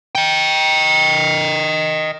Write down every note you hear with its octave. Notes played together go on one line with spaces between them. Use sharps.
D#5 G5